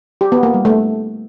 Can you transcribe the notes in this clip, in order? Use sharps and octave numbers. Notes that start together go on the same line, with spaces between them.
G4
B3
A#3
G3
A3